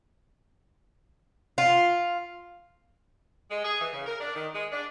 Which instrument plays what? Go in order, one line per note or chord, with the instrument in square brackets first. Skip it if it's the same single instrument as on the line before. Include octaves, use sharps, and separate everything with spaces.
[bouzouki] F4
[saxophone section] G#3
G#4
E3
C#3
A#4
D4
D#3
G#3
D4